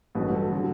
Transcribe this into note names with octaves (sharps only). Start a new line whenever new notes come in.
A1 G2 F#3 B4
A4
D3 F#3 F#4